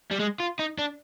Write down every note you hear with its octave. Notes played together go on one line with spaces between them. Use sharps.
G3
G#3
F4
D#4
D4